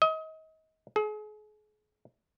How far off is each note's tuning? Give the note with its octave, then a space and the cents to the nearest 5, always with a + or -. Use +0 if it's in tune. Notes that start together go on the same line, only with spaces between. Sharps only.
D#5 +30
G#4 +40